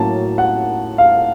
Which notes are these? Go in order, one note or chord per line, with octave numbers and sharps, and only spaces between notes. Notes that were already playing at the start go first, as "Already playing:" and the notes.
Already playing: A2 F#3 A#3 C#4 A5
F#5
F5